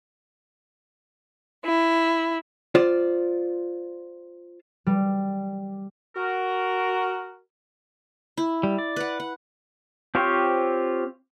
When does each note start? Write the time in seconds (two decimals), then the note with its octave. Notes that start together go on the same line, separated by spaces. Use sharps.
1.64 E4
2.75 F4 C5 D5
4.87 G3
6.16 F#4 A#4
8.37 E4
8.63 G3
8.79 D5
8.96 B4 F#5
9.20 F#5
10.15 C4 F4 G4 C5 C#5